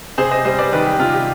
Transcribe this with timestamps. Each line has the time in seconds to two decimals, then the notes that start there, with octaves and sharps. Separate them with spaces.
0.18 C3 G#4 C5
0.31 C5 D#5
0.45 G3 C5 D#5
0.59 B4 D5
0.73 D#3 G4 B4
0.87 G4
0.99 C3 F4
1.14 G4